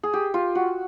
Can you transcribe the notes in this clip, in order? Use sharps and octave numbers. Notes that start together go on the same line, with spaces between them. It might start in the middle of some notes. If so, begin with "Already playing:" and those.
G#4
G4
F4
F#4